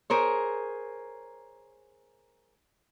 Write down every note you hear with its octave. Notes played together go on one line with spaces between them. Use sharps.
G#4 A#4 C5 C#5